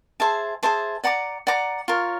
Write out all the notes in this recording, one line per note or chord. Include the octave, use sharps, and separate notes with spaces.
G#4 C5 E5 A5
G#4 C5 E5 A5
D5 F#5 A#5 D6
D5 F#5 A#5 D6
F4 A#4 C#5